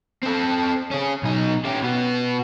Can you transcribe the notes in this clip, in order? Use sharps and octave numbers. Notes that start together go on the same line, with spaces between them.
C4 A4
C#4 G#4
B1 D#4
C#4 G4
B2 B3